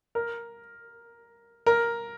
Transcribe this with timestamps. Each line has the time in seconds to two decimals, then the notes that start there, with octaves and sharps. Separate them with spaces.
0.15 A#4
1.66 A#4